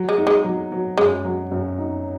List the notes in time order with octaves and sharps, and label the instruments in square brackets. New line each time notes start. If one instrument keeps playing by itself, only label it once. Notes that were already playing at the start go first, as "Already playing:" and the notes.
Already playing: [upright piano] F#3
[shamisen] G#3
[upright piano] D#4
[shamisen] G#3
[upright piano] F#3
F#3
[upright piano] F#2 [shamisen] G#3
[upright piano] F#3
F#2
D#4